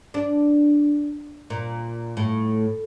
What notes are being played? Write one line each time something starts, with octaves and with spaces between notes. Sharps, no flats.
D4
A#2
A2